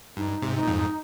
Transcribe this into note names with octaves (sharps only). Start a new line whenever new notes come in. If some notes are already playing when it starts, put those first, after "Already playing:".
G2 D#4
G#2 C3
D#4
A#2
F2 G#2